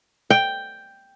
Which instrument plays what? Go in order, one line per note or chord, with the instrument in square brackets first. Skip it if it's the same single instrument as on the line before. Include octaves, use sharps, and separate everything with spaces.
[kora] G5